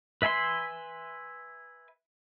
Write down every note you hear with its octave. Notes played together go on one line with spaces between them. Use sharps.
B4 E5 G#5 B5 C6